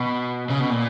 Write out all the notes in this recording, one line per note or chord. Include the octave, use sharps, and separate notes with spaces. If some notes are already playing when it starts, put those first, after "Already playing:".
Already playing: B2
C#3
B2
A#2